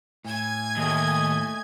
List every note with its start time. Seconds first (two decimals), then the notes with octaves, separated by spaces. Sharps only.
0.25 A2 G#5 G#6
0.77 D#2 A3 D#5